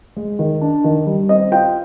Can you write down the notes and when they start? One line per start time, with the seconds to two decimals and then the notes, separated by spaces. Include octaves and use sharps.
0.16 G#3
0.39 D#3
0.61 D4
0.84 D#3
1.06 G3
1.29 C4 D#5
1.52 F4 G5